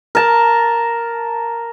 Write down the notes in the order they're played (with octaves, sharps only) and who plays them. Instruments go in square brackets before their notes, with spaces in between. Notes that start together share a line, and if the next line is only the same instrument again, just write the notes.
[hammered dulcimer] A#4 A5